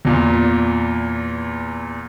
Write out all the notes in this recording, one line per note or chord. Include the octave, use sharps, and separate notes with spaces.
E2 A#2